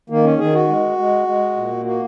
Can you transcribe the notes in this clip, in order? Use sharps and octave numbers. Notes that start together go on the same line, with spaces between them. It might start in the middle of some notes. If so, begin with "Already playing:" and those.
D#3 A#3
C#4
D#3 G#4
F#4
G#3
G#3
G#3
A#2
A#3 F#4